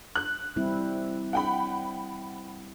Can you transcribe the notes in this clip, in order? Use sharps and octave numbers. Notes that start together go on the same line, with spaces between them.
F#6
G3 C4 E4
F#5 G5 B5